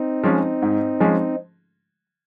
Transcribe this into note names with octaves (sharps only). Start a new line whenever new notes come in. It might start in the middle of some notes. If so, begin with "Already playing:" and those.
Already playing: C4 D#4
F3 G#3 C#4
G#2
F3 G#3 C#4